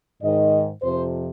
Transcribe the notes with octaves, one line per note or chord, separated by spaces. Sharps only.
G#2 D#3 D#5
F2 C3 F3 C5